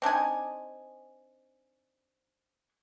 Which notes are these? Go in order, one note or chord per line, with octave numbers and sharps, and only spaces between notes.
C4 D4 D#4 G#5